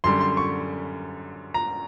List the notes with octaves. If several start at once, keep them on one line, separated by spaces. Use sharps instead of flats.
F#2 D3 G3 C6
C6
C#6
A#5